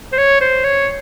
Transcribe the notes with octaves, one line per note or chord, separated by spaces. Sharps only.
C5
C#5
C5
C#5